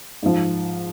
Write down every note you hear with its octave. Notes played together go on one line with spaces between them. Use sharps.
G#2 F3